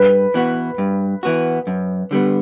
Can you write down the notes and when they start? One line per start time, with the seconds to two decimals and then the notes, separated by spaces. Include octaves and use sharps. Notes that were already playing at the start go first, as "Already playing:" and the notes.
Already playing: G2 B4
0.34 E3 B3 F#4
0.78 G2
1.23 E3 B3 F#4
1.67 F#2
2.11 D3 G3 B3